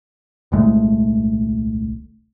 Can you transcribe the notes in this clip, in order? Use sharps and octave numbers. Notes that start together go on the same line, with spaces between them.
D#1 C2 G#3 A3